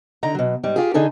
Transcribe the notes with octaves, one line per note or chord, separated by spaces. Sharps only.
D3 D#4 A#5
B2 F#3
G#2 G3
F4 G4 G#4
D3 D#4 G#4 A4 G#5